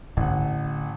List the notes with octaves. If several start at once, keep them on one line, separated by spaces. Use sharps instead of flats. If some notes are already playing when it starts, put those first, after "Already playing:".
A1 D3 F#5